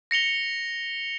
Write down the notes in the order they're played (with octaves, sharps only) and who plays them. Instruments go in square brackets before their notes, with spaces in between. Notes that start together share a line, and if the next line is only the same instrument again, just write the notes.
[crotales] A#6 C#7 F7 G7